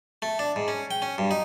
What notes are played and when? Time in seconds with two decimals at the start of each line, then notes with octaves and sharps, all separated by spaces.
0.22 A3
0.39 D4
0.56 G#2
0.68 C#4
0.91 G5
1.02 C#4
1.18 G2
1.31 D#4